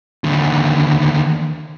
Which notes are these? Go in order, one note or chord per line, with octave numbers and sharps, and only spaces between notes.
D#2 D3